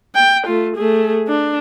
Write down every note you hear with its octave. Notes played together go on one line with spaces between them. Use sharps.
G5
A3 F4
A3 G#4
D4